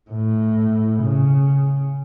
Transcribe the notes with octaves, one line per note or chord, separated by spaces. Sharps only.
A2
C#3